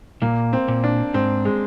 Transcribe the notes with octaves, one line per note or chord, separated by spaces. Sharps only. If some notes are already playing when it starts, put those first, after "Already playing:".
A#2 A#3
C4
A#2
D4
G#2 C4
G#3